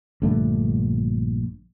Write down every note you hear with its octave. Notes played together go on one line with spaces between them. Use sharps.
A#1 G2 D3 A3